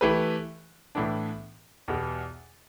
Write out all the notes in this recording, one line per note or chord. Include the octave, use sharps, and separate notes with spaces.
E3 A3 G4 B4
A2 E3 B3 D4
E2 B2 B3 G4